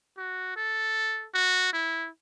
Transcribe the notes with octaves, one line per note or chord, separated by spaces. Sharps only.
F#4
A4
F#4
E4